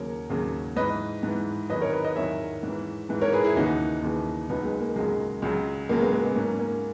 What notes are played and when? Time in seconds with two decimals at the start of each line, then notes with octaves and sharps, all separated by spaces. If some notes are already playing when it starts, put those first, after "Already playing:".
Already playing: D#2 C#3 F#3 A#4 C#5
0.30 D#2 C#3 F#3
0.76 G#2 E3 B4 D#5
1.23 G#2 E3
1.70 E2 D#3 F#3 B4 D#5
1.81 A#4 C#5
1.93 B4 D#5
2.04 B4 D#5
2.16 E2 D#3 F#3 C#5 E5
2.63 G#2 E3
3.09 G#2 E3
3.21 A#4 C#5
3.33 G#4 B4
3.44 E4 G#4
3.56 D#2 C#3 E3 D#4 F#4
4.03 D#2 C#3 E3
4.49 C#2 C#3 F#3 B3 D#4
4.65 G#3 B3
4.80 A#3
4.96 C#2 C#3 F#3 G#3
5.42 C#2 C#3 F#3
5.89 C#2 C#3 F#3 A#3
6.01 G#3 B3
6.13 A#3
6.24 G#3 B3
6.36 G#2 F#3 A#3 C#4
6.59 A#3 C#4